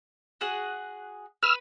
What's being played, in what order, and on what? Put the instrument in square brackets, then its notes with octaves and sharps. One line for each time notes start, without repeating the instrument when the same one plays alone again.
[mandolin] F#4 G#4 F#5
[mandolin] B4 [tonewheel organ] E6 F6